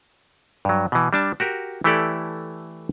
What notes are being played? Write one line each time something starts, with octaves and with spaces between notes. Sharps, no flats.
G2 F#3
B2 E3
G3 D4 A5
F#4 G4 A#4
E3 A3 E4 G4 A4 D5